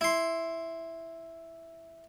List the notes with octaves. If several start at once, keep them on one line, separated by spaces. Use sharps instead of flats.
E4 C6